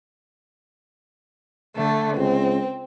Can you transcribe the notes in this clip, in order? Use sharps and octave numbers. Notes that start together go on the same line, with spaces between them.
D3 A3
C#2 C4